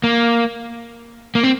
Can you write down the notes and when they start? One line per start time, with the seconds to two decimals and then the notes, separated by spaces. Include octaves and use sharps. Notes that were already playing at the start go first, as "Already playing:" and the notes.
0.04 A#3
1.35 A#3
1.43 C4